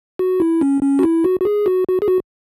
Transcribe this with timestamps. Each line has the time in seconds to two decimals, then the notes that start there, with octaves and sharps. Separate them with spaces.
0.19 F#4
0.40 E4
0.61 C#4
0.83 C#4
0.99 F#4
1.03 E4
1.24 F#4
1.41 F#4
1.45 G#4
1.66 F#4
1.88 F#4
2.02 G#4
2.08 F#4